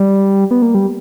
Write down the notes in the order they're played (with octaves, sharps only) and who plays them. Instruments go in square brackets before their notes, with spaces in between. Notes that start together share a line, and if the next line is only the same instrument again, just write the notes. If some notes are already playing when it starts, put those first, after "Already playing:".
Already playing: [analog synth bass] G3
B3
A#3
G3